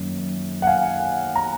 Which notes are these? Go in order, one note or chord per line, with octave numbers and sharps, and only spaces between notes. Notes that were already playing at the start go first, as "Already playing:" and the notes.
Already playing: F#2 D#3 A#3 C#4
F#5
F5 G#5
A#5